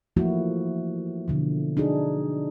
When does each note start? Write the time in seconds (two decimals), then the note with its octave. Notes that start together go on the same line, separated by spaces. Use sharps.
0.16 E3 F3 A3 A#3 E4 F#4
1.28 B2 D3 F3
1.77 D4 D#4 F#4 G#4